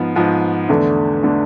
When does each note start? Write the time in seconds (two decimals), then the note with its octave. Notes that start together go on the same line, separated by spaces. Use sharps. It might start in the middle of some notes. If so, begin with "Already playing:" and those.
Already playing: G#2 F3 B3
0.16 G#2 F3 B3
0.69 E2 D3 A3 D4
1.23 D3 A3 D4